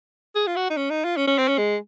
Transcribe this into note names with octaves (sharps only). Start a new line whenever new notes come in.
G#4
F4
F#4
D#4
C#4
D#4
F4
C#4
C#4
C4
C#4
G#3